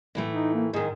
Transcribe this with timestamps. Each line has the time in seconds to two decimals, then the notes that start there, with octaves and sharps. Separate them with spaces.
0.15 A2 E3 A3
0.32 D#4
0.54 A#3
0.73 G#2 D#3 G#4